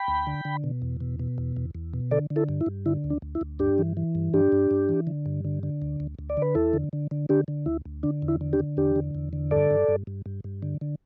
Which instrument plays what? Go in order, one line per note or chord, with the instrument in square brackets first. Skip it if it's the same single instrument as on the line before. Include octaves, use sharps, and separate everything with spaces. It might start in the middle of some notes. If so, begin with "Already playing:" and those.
Already playing: [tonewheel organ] G5 B5
D2
D3
D3
B2
E2
B2
B2
E2
E2
E2
B2
D3 A4 D5
D3
E4 A4
G2
E4
G2
D3 E4
D2
D4
D2
E4
D2
G2 D4 G4
E3
E3
G2
G2 D4 G4
G2
G2
E3
D3
G2
D3
D3
D2
D2
D2
D5
D3 B4
E2 E4 A4
D3
D3
D3
D3 D4 G4
D3
D2 E4
D2
D3 D4
E2
E4
D3
D4 G4
D3
E2 D4 G4
D3
E2
D3
G2 A4 D5
G2
G2
G2
G2
G2
D3
D3